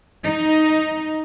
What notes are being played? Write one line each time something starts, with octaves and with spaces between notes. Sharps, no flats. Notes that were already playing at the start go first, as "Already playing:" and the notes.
D#4